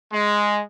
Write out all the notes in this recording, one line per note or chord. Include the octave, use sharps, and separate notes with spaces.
G#3